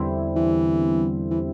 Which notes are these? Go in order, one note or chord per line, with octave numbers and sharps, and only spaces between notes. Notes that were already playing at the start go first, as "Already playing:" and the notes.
Already playing: E2 D3 G3 C4 E4
E3
E3